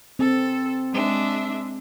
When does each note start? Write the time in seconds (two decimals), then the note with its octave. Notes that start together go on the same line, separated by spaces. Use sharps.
0.19 C4 A4
0.91 G#3 D4 E5